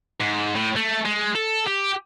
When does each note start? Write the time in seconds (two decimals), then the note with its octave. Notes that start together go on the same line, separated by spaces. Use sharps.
0.21 G#2
0.56 A2
0.76 A3
1.05 G#3
1.35 A4
1.67 G4